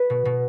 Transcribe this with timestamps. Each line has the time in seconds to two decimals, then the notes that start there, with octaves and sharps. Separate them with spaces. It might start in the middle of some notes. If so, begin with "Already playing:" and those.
Already playing: B4
0.10 B2
0.25 B2